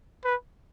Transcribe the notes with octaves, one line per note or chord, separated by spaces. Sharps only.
B4